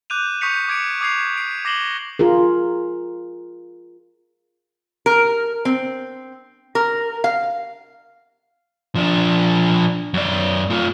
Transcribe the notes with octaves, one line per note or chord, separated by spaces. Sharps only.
D6 F#6 G6 D#7 F7
C#6 D#6 G6 B6 C#7 F7
D6 G#6 C#7 D7
D6 D#6 G#6 C7 F7
C7 D7
D6 A#6 C7 E7 F#7 G7
F4 G#4 A#4
A#4
C4
A#4
F5
F3 D4
F#2 D5
A3 F4